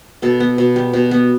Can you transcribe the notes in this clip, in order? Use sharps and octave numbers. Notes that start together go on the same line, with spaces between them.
B2 A4
B3
B2
G3
B2
B3